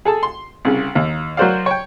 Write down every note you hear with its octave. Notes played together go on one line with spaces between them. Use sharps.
G#4 A4 A5
C6
C2 C#3
D#2
F#3 F#4 A#4 C5 D5 F5
C#5 G5